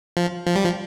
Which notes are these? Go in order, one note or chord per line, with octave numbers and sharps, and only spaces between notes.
F3
F3
G3
F3